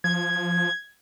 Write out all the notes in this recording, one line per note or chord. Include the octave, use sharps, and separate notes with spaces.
F3 G#6